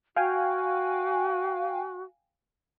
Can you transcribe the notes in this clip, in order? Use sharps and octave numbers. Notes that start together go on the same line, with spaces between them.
F#4 F5 G5 G#5